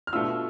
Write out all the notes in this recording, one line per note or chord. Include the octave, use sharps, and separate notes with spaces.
F6
B2 A3 D4 F4 E6